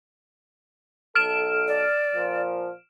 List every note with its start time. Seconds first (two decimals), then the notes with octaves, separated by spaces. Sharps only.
1.15 B1 A4 F6 D7 E7
1.68 D5
2.15 A#2 F3